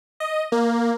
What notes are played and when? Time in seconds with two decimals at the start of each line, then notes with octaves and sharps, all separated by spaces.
0.20 D#5
0.52 A#3